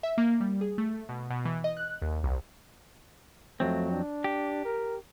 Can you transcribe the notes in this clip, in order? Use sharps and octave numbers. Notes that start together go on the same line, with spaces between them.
E5
A#3
G3
G#4
A3
B2
B2
E3
D#5
F#6
D#2
C2
F2 F#3 A3 C4
D4
G4
A#4